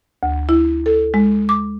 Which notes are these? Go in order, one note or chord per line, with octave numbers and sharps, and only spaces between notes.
D2
E4
A4
G#3
D6